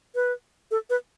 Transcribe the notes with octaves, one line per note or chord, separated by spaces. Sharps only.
B4
A4
B4